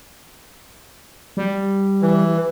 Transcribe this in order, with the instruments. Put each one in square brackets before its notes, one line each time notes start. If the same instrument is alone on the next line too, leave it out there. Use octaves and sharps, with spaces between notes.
[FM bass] G3
[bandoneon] E3